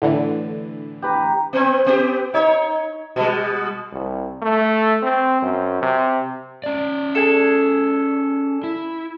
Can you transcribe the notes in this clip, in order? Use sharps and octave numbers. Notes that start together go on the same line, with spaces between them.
A2 D3 E3
G4 B4 A#5
B3 C4
B3 G4
D#4 C#5
B2 G3
C2
A3
C4
F#2
C3
C#4 D5
G#4 A4
E4